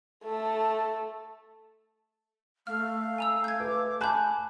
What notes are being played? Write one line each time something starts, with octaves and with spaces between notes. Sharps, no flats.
A3 A5
A3 F5 F6
G#5 A#5 E6
G6 G#6
B4 D6
G#5 A5 B5 F#6 G6